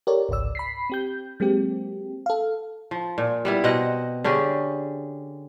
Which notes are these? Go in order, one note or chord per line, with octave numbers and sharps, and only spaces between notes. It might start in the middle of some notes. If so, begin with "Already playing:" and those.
G4 A4 A#4 C#5 D5
G#1 C#2 G#2 D5 E6
B5 B6 C7
C4 G4 G6
F#3 G#3 A#3 C4 G4
A4 F5
F3
A#2
G3 B3 E4
B2 C4 D#5 F#5
D3 C#4 G4 G#4